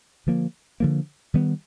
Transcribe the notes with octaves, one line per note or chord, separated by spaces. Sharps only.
D3 F3 A#3
D3 F3 A#3
D#3 G3 B3